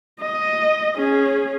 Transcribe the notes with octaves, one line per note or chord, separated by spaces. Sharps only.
D#5
C#4 G#4